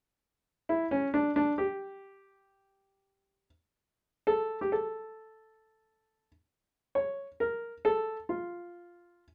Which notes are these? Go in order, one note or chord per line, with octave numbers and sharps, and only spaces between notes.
E4
C#4
D4
D4
G4
A4
G4
A4
C#5
A#4
A4
F4